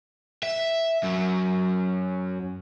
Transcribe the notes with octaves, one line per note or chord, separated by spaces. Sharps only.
E5
F#2